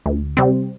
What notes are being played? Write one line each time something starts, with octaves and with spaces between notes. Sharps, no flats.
D2
C3 G3 C4